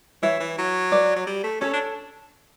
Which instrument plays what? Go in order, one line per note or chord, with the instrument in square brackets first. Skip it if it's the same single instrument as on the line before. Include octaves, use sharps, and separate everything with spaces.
[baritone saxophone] E3 [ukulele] C#5 E5
[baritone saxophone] E3
F#3
[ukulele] B4 D5
[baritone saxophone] F#3
G3
A3
[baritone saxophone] C#4 [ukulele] A4 C#5
[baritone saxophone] D4